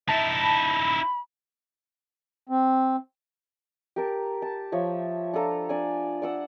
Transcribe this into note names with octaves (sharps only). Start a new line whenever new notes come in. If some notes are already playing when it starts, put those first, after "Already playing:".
D#4 E4 E5 A5
B5
C4
G4 A#4 A5
A5
F3 C#5 E5
D4 F4 A4 A#5
D4 D5 G#5
D5 F#5 E6